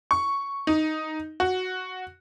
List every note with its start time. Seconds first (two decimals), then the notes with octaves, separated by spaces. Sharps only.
0.11 C#6
0.67 D#4
1.40 F#4